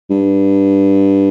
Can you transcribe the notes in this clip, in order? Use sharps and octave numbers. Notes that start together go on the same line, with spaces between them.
G2